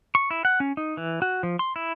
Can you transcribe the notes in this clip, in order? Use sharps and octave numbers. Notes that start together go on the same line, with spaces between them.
C#6
E4
F#5
C#4
D#4
E3
F#4
F3
C6
E4